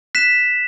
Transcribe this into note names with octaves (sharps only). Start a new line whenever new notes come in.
F#6 B6 E7